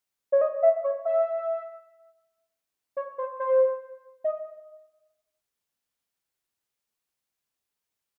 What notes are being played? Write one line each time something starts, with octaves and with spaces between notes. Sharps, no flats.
C#5
D#5
E5
C#5
E5
C#5
C5
C5
D#5